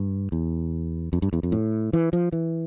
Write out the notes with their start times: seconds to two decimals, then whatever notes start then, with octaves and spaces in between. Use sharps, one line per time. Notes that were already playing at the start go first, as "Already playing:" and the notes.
Already playing: G2
0.32 E2
1.13 F2
1.22 G2
1.33 E2
1.43 F2
1.52 A2
1.93 E3
2.13 F3
2.32 E3